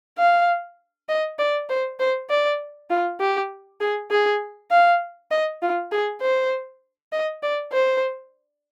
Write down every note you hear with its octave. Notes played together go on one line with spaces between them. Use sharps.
F5
D#5
D5
C5
C5
D5
F4
G4
G#4
G#4
F5
D#5
F4
G#4
C5
D#5
D5
C5